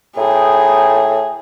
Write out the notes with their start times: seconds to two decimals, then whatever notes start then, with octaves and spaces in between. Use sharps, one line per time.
0.17 A2 B3 D#4 G#4 G5